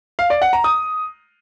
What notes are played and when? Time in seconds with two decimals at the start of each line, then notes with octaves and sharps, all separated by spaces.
0.19 F5
0.30 D5
0.42 F#5
0.53 A#5
0.64 D#6